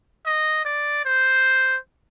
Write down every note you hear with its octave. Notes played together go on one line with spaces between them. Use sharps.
D#5
D5
C5